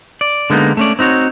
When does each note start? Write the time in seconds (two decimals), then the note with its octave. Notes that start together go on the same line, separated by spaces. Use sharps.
0.21 D5
0.50 D3 G#3 A#3 B3 D#4
0.77 A3 C#4 D5
0.99 C4 D#4 F#4 C#5